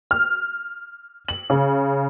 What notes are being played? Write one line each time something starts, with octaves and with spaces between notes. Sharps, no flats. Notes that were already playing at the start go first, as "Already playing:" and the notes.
F6
F#7
C#3